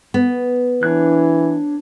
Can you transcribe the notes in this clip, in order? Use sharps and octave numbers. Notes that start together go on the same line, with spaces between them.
B3
E3 D4 C#5 F#6